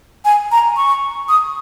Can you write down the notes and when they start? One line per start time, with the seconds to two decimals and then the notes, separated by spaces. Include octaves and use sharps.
0.25 G#5
0.52 A#5
0.77 C#6
1.29 D#6